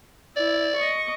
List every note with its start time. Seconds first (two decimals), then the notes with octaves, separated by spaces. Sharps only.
0.36 E4 D5
0.77 D#5 C#6